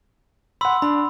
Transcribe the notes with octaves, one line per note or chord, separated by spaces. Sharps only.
F#5 B5 C6 E6
D4 B5